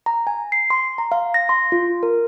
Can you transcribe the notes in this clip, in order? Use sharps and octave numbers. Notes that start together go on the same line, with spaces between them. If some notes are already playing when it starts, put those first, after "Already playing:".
A#5
G#5
C7
C6
A#5
F5
A#6
C6
F4
A#4